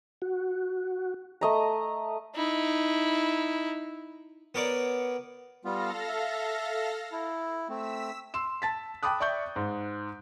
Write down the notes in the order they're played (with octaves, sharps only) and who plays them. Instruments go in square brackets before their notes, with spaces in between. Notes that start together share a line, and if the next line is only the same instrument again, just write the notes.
[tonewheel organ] F#4
[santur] A3 D#5 A#5
[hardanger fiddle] D#4 E4
[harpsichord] B3 A#4 C#5 D5
[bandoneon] G3 B3 F4 [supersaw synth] A4 F5 A#6
[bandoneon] E5
E4
[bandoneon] A3 C4 [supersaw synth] E6 B6
[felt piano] C6 E6 E7
A5 A6 B6
G5 A5 B5 D6 D#6 F#6
D5 E5 C#6 G6
G#2